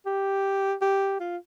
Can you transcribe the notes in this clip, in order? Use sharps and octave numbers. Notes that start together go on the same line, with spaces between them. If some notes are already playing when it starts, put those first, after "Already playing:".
G4
G4
F4